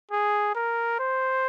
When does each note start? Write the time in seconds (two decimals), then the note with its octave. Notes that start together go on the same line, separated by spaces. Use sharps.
0.11 G#4
0.55 A#4
1.00 C5